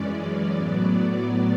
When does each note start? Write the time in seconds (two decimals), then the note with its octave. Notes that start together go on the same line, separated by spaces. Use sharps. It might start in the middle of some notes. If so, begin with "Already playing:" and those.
Already playing: F#2 E3 G#3 C#4 D5
0.54 A2 F#3 B3